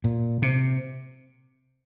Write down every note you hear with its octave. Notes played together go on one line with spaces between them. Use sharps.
A#2
C3